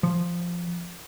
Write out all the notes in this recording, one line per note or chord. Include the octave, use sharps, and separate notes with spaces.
F3